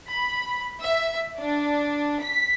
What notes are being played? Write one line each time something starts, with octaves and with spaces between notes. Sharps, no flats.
B5
E5
D4
B6